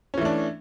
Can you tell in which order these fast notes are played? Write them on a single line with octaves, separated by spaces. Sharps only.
C#4 E3 A3 D4